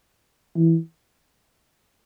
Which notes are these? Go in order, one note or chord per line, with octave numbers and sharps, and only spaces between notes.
E3